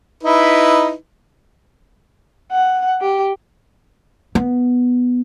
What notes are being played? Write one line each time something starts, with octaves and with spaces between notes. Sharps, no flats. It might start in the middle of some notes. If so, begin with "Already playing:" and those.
D#4 E4 B4
F#5
G4
B3